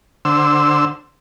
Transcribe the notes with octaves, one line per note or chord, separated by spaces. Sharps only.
D3 C5 E6